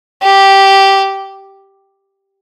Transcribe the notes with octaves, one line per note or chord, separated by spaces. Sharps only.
G4